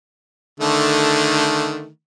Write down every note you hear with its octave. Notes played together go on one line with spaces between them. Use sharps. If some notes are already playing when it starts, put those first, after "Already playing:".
D3 D#3 A3